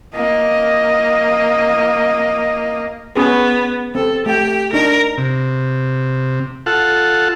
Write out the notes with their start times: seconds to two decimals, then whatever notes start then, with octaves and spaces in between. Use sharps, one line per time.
0.16 A#3 D#5
3.16 B3 C#4 G#4 B4
3.95 C4 A4
4.26 A3 G4 G5
4.73 D4 D#4 A#4
5.17 C3
6.66 F4 A4 F#5